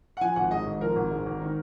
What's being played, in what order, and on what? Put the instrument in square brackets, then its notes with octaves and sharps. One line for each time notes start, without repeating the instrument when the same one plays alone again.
[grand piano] F#5
F3 G#5
G#1 F#5
G#2 D#5
G#1
F3 A#4
G#1
G#2
G#1
D#3